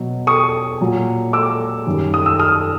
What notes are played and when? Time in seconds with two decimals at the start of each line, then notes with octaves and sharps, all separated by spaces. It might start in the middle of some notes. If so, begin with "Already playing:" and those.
Already playing: B2 F#3
0.27 C#6 D#6
0.81 A#2 F#3
1.33 D6 E6
1.86 F#2 D#3 G3
2.14 D#6
2.26 E6
2.39 D#6 F6